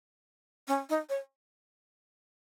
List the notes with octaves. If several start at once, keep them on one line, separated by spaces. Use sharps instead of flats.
C#4
D#4
C#5